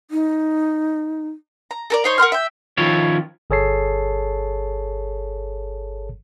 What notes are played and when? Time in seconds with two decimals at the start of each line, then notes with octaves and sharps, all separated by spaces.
0.11 D#4
1.71 A#5
1.90 A4 A#4 D5
2.04 D#4 C5 C#5
2.18 A#4 F#5 C6 F6
2.32 E5 G5
2.77 D#3 F3 C#4 E4 F4 C#5
3.50 G1 G#4 A4 C#5 A5 C7